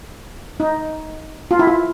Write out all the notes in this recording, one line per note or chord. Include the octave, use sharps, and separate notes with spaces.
D#4
F4
E4
F4